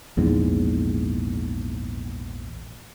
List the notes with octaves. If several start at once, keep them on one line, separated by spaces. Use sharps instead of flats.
A#1 E2 G#2